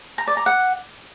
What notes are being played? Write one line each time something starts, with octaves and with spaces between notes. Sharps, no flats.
A#5
D5
A#5
F#5